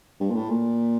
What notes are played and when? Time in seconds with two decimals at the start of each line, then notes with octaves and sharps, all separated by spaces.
0.20 G2
0.30 A#2
0.35 A2
0.49 A#2